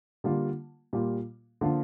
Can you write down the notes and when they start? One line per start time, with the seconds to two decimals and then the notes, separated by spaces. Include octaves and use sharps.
0.24 D3 G3 A#3 F4
0.93 A#2 G3 A#3 F4
1.61 D3 F3 A#3 D4 F4